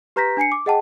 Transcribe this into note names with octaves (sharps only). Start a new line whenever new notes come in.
G4 B4 A#5 G6 A#6 B6
D4 G#5 C7 C#7
D6
G#4 D#5 F#5 G5 A5